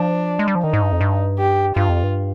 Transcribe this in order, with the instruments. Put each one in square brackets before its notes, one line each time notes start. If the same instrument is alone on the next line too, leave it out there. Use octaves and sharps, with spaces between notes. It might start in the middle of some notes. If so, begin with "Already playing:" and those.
Already playing: [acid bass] F3 [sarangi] D4
[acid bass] G#3
G3
F3
[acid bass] D#3 [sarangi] D#4
[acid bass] G#2
G2
F2
G2
[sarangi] G4
[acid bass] G2 [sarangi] F4
[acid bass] F2
G2